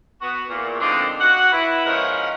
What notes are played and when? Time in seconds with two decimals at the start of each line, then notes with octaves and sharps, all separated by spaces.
0.21 B3 F#4
0.50 E2 A#2
0.81 D3 F3 G#3 C4 D4 D#4
1.21 F#4 F#5
1.53 E4 B4
1.85 G#2 F3 C#4 D#4 A#4 F#5